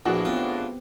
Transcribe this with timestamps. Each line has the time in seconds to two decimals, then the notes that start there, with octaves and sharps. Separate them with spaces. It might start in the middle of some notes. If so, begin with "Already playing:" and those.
0.06 A#1 A2 E3 D4 F#4 G#4
0.25 B3 C4 F4 G4